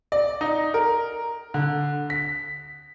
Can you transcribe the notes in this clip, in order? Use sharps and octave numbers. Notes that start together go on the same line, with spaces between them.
D5
D#4
A#4
D3
B6